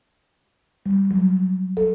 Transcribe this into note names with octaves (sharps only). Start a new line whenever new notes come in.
G3
F#3
A4